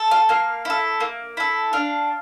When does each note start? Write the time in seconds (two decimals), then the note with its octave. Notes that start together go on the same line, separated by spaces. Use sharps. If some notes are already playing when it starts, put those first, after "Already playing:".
Already playing: A4
0.11 F5
0.29 A#3 F5
0.65 E4 A4
1.00 A#3
1.37 E4 A4
1.73 D4 F5